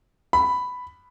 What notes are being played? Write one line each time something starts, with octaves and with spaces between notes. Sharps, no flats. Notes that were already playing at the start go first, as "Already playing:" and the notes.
B5